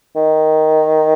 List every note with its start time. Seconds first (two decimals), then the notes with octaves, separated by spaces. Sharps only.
0.16 D#3